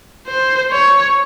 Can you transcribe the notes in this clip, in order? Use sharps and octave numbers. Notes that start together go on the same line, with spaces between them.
C5
C#5